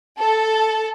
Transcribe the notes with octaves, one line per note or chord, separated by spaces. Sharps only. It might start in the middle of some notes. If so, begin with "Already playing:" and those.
A4